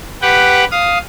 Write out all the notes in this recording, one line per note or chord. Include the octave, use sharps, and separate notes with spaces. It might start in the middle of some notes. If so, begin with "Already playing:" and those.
G4 B4 F#5 G5
F5 D#6